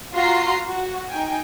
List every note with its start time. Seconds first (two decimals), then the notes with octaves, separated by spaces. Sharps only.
0.14 F4 F#4 A#5 C6 C7
0.66 F#4
1.09 D#4 G5 G#5